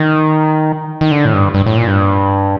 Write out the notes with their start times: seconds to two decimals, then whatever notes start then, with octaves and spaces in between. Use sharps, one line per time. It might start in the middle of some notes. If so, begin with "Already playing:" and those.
Already playing: D#3
1.01 D#3
1.11 D3
1.25 A2
1.34 G2
1.54 G2
1.66 A2
1.77 A#2
1.87 G2